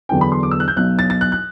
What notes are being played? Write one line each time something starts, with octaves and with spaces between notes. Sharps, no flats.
E2 D3 F#3 B3 D4 G5
B5
C6
D6
E6
F#6
G6
B1 B2 F#3 F#6
A6
A6
F#6
F#6